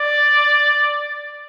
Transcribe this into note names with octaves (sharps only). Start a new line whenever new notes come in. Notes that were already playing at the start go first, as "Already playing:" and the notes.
Already playing: D5